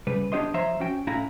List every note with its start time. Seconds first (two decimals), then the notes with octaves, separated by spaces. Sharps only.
0.07 C#3 G3 B4
0.32 B3 D4 G4 C#5 D#5 C6
0.54 F3 C5 C#5 E5 A#5 C6
0.80 C#4 F#4 G5
1.07 A2 C#4 E4 F5 A#5 B5